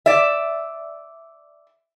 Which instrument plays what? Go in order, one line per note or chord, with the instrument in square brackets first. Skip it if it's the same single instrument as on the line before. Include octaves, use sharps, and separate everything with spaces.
[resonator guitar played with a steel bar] D5 E5